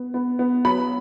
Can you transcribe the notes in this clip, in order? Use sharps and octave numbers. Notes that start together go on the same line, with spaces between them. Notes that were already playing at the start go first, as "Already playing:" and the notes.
Already playing: B3
B3
B3
F#3 B5